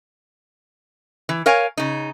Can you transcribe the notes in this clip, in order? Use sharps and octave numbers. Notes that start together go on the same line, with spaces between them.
E3
A#4 C#5 F5 G#5
C#3 D#4